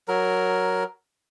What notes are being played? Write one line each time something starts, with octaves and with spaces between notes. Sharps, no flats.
F#3 A#4